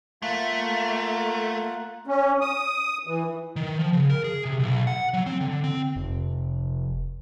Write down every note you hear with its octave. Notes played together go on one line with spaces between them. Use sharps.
A3 A#3 F4 F#5
C#4
D#6
E3
D#3
F3
C#3
A#4
G#4
C3
B1
F#5
F#3
C4
D3
C4
F1